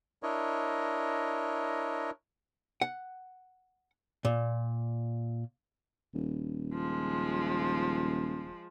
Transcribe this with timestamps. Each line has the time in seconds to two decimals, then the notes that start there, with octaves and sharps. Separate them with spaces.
0.23 D4 E4 A#4 C#5 D#5
2.81 F#5
4.25 A#2
6.14 D#1
6.73 F3 G#3